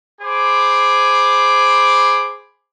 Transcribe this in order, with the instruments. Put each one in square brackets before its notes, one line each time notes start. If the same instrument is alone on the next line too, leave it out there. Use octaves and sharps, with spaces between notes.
[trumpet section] G#4 C5 B5 D6